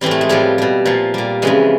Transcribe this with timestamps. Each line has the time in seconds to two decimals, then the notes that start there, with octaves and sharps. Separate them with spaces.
0.01 A2 E3 G3 C4
0.11 A3
0.21 G#3
0.29 A2 F3 G3
0.58 B2 G3
0.85 A#2 F3
1.14 A#2 G3
1.42 F2 C#3 E3 G#3